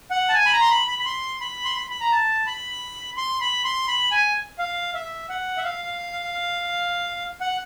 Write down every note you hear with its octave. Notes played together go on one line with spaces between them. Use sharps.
F#5
A5
G#5
B5
A#5
C6
B5
B5
B5
C6
B5
C6
B5
B5
A#5
A5
B5
C6
B5
C6
B5
G#5
F5
E5
F#5
E5
F5
F#5